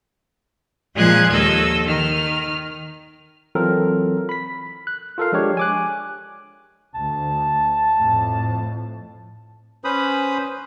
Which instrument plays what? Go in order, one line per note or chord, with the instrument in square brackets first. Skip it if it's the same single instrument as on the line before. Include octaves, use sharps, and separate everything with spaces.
[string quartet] A#2 F3 G#3 G#5 F#6 G#6
D#2 A4 D#5 E6
D#3 F6
[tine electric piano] E3 F#3 C4 F4 A4 A#4
B5 B6
F#6
F4 A4 A#4 F5
F3 G#3 D4 G4 C#5
G#5 D6 F#6
[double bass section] D2 [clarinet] A5
[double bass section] F2 A2
[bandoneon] C#4 B4 C5 B5 D#6